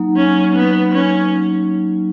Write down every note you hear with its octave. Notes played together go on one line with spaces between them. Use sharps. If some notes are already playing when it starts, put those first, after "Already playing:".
Already playing: F#3 A#3 D#4
C#4
B3
C#4